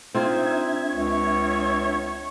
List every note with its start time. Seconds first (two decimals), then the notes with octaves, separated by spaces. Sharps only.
0.14 C4 D4 D#4 F4 C5 E5 G#6
0.93 C#2 C#5